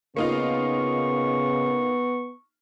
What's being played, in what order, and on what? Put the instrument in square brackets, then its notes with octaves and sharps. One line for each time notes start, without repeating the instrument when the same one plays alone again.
[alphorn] C#3 [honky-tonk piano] A#3 D#4 F4 [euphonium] B3 [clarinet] C#6